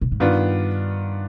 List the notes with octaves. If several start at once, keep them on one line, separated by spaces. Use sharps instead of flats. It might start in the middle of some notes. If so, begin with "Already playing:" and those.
B2
G#2
G2 D#3 B3 D4 F4